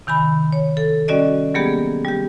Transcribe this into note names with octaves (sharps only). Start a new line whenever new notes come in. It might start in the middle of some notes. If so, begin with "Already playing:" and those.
C3 D#3 G#5 B5
C#5
A4
G3 C#4 F#4 D5 D#5
F#3 G3 A#3 B3 G4 G#4
G3 G4